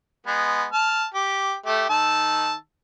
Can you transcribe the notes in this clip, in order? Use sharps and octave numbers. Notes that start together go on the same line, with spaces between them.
G#3 B3
A5 F6
G4
A3 G4
D#3 A5 E6